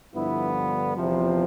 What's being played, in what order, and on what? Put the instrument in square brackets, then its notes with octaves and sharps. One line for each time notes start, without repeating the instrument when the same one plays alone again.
[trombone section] G2 D3 F3 B3 E4
E2 C3 F3